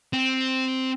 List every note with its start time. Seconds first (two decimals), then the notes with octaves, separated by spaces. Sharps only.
0.13 C4